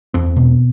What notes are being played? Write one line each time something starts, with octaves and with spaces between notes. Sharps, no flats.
E2 C4
B2